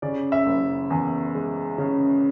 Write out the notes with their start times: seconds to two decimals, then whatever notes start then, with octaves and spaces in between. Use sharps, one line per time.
0.02 C#3 D5
0.32 E5
0.46 F#1
0.90 E2
1.34 G#3
1.78 C#3